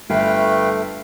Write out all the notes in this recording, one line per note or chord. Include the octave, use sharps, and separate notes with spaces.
G1 A3 B4 F5 G5